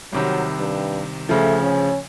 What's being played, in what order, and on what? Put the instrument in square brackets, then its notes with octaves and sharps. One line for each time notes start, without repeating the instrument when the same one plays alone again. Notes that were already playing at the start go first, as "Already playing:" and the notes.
[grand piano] C2 C3 D#3 [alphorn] F#3
[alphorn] G2
[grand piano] D2 C#3 F3 [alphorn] A3
[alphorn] C#4